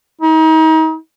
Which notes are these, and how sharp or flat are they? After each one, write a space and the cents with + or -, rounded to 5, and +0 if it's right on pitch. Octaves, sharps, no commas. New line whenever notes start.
D#4 +35